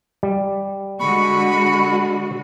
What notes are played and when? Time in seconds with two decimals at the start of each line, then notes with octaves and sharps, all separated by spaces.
0.23 G3
1.00 D3 G#3 F#4 B5 C#6